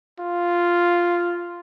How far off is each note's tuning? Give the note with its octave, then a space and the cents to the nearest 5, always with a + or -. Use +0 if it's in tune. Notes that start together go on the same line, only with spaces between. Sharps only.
F4 -5